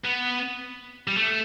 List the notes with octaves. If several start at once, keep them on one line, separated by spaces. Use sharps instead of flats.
B3
G3
A3